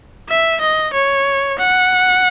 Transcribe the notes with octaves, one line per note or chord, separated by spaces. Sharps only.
E5
D#5
C#5
F#5